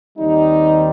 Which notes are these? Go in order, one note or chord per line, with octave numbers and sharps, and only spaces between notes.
D#2 D#3 G3 C4 D#4